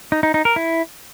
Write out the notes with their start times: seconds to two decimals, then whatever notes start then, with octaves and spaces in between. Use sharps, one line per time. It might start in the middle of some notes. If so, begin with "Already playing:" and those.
0.12 D#4
0.23 D#4
0.34 D#4
0.45 A#4
0.56 E4